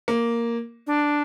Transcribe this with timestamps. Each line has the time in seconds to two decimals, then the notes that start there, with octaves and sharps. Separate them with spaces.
0.08 A#3
0.87 D4